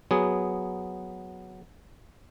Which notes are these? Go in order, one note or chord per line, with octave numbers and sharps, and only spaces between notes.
F#3 B3 G#4